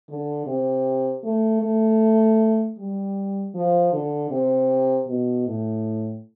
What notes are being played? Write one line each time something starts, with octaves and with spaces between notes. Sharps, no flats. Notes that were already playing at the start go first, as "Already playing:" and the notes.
D3
C3
A3
A3
G3
F3
D3
C3
B2
A2